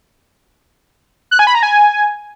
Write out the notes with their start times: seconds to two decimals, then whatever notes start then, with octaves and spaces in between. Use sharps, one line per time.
1.31 F#6
1.39 G#5
1.47 B5
1.55 A#5
1.63 G#5